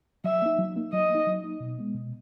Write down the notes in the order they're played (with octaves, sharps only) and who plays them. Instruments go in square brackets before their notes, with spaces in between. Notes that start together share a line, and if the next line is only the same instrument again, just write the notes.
[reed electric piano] F#3 [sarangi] E5
[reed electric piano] A#3 D#4
F#3
A#3 D#4
[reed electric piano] F#3 [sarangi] D#5
[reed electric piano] A#3
D#4
F#3
A#3 D#4
B2
G#3 B3
B2